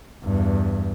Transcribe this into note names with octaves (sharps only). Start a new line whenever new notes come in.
E2 G2